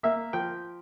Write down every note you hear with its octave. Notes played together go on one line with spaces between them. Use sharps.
A#3 E5
F3 G5